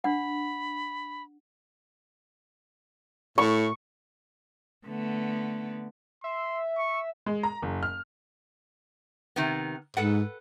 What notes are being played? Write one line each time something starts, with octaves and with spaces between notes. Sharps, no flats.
D4 F#5 B5
A2 C#6
D3 A3 B3
E5 C6
C#6
G#3
A#5
F#1
F6
C3 D#3 B3
G#2 A4 B4 F#5